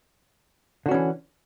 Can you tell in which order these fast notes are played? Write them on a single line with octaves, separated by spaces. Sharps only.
D3 F#4 C#4 E3